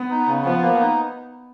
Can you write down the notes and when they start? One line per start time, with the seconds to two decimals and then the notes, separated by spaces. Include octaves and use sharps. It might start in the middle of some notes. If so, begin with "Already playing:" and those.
Already playing: B3
0.10 D#4
0.27 C#3
0.44 F3 B3
0.61 A#3
0.79 D#4